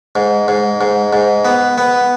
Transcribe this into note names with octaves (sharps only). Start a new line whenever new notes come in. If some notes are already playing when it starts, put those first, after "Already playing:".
G#2
G#2
G#2
G#2
B3
B3